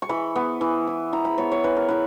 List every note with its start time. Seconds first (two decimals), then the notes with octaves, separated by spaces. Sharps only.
0.02 C#6
0.09 E3 B5
0.36 B3
0.61 E3
0.87 E4
1.13 E3 A#5
1.25 B5
1.38 B3 C#5
1.52 C#5
1.64 E3 B4
1.77 A#4
1.89 E4 B4